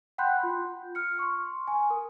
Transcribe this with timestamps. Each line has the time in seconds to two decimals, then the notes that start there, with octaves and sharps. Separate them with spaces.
0.18 F#5 G5 B5 C6 F#6 G6
0.43 F4
0.95 F6 C#7
1.19 C6 C#6
1.68 G#5
1.90 A#4